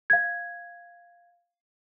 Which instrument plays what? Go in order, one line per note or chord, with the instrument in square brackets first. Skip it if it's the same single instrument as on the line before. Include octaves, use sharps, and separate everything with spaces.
[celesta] F5 G#6